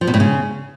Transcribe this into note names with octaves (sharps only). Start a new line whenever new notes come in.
F3
B2
A2
C#3